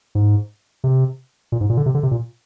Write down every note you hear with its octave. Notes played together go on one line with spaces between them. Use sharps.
G#2
C3
A#2
G#2
A#2
D3
C3
D3
C3
A#2